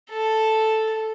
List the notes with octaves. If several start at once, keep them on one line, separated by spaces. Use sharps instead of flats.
A4